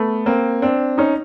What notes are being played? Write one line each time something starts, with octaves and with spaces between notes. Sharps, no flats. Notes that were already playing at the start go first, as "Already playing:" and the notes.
Already playing: A3 B3
A#3 C4
C4 D4
C#4 D#4